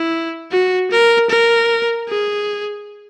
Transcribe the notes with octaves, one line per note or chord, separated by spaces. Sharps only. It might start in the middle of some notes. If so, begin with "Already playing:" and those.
Already playing: E4
F#4
A#4
A#4
G#4